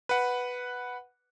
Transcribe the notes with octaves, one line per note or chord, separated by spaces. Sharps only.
B4 F#5